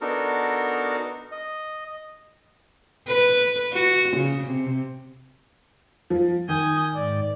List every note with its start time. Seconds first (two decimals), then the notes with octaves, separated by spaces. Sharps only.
0.01 B3 D4 D#4 F#4 A4 A#4
1.32 D#5
3.08 B4
3.73 F#4
4.17 C#3
4.47 C3
6.10 F3
6.49 D#3 G#5 D#6 G6
6.94 G#2 D5